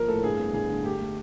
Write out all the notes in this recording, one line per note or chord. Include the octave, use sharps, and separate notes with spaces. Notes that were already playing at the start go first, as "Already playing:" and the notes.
Already playing: F3 A#3 A#4
A2 A4
G2 G#4
B3
G2 G#4
D3
A3 G4
A3